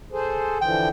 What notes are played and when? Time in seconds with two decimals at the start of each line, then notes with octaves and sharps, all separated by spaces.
0.12 G#4 A4 C5
0.61 D3 E3 F3 G5